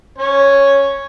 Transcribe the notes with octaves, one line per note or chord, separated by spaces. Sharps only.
C#4 C#5